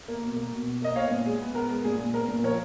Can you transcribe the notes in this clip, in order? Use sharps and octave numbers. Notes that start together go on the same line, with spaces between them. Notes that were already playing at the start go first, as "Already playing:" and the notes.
A#3
B2
A#3
B2
B2
A#3 D#5
B3 C#5 F5
A#2
G#3 G#4
B3
B3 A#4
G#3
A#2 G#4
A#2
B3 A#4
A#2
F3 A#4 C#5